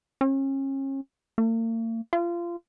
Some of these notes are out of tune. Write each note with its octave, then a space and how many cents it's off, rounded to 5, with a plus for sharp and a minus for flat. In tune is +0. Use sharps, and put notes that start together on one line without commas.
C#4 -35
A#3 -45
F4 -25